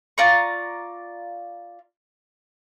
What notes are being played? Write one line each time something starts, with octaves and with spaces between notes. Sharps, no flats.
F4 D5 A#5 C#6